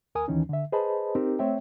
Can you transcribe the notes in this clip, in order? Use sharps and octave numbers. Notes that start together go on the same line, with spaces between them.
D2 A#4 G#5 D#6
D#2 D#3 E3 C#4 D#4
D3 E5
G#4 B4 C5 D#5 A5 B5
C4 D#4 G4 A#4
A3 C4 C#5 E5 G5